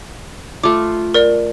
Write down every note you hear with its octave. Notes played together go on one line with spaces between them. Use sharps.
A3 F4 D6
A#4 D5